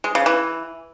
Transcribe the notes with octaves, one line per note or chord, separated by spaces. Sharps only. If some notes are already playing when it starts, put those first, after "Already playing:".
G#3
C#3
E3